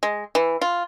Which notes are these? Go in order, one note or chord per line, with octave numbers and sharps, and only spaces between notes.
G#3
E3
F4